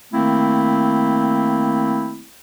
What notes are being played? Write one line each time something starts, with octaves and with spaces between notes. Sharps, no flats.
D#3 A3 A#3 C4 E4